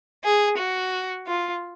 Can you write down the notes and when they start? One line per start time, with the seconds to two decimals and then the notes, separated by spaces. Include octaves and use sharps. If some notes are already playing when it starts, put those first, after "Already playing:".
0.24 G#4
0.58 F#4
1.27 F4